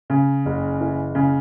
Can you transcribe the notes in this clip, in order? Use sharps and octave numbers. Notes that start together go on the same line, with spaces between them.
C#3
F#1
E3
C#3